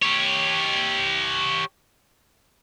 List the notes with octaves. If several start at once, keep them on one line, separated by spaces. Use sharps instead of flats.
G4 C#5